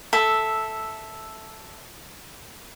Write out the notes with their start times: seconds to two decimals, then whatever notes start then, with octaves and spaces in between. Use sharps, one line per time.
0.13 A4 E5